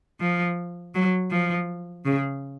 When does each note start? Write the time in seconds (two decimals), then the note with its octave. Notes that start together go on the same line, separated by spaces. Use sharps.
0.20 F3
0.95 F#3
1.31 F3
2.05 C#3